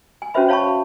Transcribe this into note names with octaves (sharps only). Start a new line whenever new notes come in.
G#5
C#4 F#4 B4 C5 E5 B5
C#5 F5 A5 B5 C#6